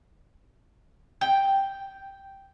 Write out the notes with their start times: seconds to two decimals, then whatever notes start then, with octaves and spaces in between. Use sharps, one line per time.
1.21 G5